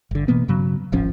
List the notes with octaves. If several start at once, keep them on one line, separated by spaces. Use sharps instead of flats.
G1 D3
B2 E3 A#3 B3
G2 C#3 F#3
D1 G#1 F3 C#4